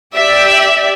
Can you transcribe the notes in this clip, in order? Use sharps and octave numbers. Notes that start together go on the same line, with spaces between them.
G4 D5 E5